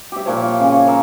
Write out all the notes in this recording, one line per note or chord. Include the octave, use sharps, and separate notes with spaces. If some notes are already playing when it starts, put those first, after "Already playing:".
G4 E5
A#2 F3 C#5
F4
C#3 G#5
C#5
A#4 E5